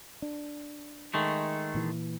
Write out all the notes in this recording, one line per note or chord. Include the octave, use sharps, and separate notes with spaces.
D4
D#3 G#3 A3
A#2 E3